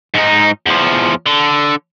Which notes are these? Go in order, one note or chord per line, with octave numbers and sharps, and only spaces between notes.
G#2 D#4
E2 F3
D3